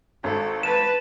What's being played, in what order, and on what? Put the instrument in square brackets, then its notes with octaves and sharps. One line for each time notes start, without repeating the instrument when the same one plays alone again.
[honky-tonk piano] G#1 [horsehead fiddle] A4
[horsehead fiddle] B4 A5 [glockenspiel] E7